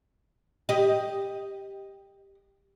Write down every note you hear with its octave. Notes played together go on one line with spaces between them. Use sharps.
G4 D#5